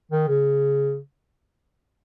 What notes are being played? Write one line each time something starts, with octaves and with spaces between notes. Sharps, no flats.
D#3
C#3